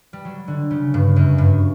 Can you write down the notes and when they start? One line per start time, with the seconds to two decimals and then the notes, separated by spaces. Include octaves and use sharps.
0.13 G3
0.25 F#3
0.48 D3
0.71 C#3
0.94 G2
1.16 F#2
1.38 G2